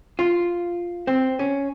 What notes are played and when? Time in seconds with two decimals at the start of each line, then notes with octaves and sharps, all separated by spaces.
0.19 F4
1.07 C4
1.39 C#4